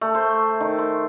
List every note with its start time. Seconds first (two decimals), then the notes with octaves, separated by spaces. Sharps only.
0.01 A3
0.15 C5
0.60 D#3
0.79 C6